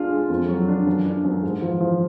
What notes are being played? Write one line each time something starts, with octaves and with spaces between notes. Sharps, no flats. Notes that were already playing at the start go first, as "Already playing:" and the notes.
Already playing: G#3 D4 F4
G#3
F2
F#3
D4
F#2
D4
F#2
G#2
F3
F3